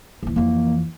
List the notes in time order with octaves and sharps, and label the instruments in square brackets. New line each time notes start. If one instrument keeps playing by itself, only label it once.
[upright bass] D#1 E3
[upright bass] F2 E3 [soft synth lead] A#3